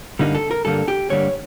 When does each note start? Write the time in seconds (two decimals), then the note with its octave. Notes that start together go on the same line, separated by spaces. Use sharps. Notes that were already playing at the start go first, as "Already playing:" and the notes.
0.19 G2 D3 G3 A#3 D#4
0.35 A4
0.51 A#4
0.65 G2 D3 G3 A#3 A4
0.88 G4
1.10 G2 D3 G3 A#3 C#5